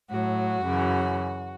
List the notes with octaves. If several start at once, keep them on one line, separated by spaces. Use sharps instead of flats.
A2 F#3 F#4
F#2 C#3 E3